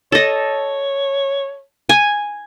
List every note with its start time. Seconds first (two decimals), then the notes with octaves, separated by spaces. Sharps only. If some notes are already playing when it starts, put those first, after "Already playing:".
0.12 A4 C#5 D#5
1.89 G#5